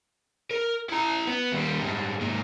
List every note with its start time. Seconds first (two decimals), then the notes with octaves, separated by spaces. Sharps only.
0.51 A#4
0.89 E4 A#5
1.27 B3
1.52 D#2 G3
1.82 G#2 G3
2.21 G#2 A#3